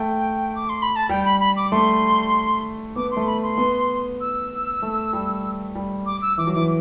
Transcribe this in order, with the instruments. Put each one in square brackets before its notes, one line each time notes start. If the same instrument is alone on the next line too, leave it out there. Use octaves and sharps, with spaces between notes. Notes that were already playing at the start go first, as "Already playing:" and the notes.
Already playing: [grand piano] A3 [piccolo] G5
[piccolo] D6
C6
B5
A5
[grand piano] G3 [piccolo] G5
[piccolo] B5
B5
D6
[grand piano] A3 [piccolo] C6
[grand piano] B3 [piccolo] D6
[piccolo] C6
[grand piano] A3
[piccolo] B5
C6
[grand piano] B3
[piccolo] E6
[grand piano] A3
G3
G3
[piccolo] D6
E6
[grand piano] E3 [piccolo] D6
[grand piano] F#3
[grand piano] E3 [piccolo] D6